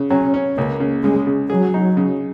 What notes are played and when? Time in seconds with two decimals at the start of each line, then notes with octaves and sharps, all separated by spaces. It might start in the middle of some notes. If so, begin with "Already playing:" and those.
Already playing: C#3
0.10 F#3 C#4
0.34 C#4
0.57 C#2 A#3
0.80 C#3
1.03 C#3 G#3
1.27 C#3
1.50 F#3 G#4
1.74 D#4
1.97 C#3